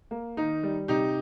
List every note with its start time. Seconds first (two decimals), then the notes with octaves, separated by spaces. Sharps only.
0.11 A#3
0.37 D#3 D#4
0.63 G3
0.88 C3 D#4 G4